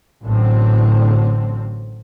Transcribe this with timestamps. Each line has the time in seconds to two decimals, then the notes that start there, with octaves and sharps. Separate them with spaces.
0.24 A1 A2 D3 F#3 C4